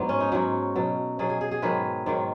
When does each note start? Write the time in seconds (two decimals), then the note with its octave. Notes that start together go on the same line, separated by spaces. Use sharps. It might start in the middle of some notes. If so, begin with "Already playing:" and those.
Already playing: G#2 F#3 B3
0.09 C#4
0.20 D#4
0.32 G#2 F#3 F#4
0.76 B2 F#3
1.19 B2 F#3 G#4
1.29 G#4
1.41 G#4
1.51 G#4
1.62 G#2 D#3 F#3 B4
2.06 G#2 D#3 F#3